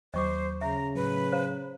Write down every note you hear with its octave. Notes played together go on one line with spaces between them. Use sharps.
D#2 F#3 C5 D#5 C#6 D6
C#3 E5 A#5
A2 F#3 B4
C5 F5 A#5